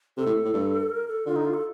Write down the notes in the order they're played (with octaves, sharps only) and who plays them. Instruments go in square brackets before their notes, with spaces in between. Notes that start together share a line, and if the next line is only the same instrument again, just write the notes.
[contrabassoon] C3 [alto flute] A4
[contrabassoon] A2
A2
G2
[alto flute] A#4
A4
[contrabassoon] D3 [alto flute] F4
[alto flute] D#4
F4
A4